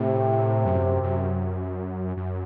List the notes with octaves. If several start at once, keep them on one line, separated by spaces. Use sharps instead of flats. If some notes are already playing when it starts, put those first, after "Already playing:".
Already playing: A2 C3
F#2
F#2
F#2